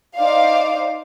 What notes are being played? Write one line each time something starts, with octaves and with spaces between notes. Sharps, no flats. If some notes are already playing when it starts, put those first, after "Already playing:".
D#4 C5 D5 F5